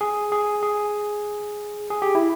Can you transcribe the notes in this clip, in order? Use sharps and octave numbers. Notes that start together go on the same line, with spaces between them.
G#4
G#4
G#4
G#4
G4
E4